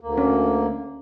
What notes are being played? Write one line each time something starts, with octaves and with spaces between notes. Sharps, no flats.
D2 A#3
C#4